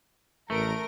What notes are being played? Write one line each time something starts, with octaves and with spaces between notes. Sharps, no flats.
A1 A3 A#4 A#5 D7